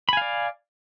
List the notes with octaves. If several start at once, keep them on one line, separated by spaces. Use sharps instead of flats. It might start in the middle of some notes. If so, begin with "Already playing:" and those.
D5 F5 G#5 B5